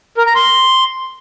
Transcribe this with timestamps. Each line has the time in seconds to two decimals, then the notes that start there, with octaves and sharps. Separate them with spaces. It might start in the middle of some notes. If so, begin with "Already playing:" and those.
0.17 A#4
0.26 A#5
0.35 C6